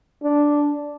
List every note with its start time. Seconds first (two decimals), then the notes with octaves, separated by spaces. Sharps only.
0.23 D4